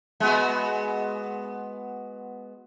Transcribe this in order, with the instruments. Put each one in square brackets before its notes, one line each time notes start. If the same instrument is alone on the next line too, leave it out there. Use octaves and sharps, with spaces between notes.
[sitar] G#3 B3 F#4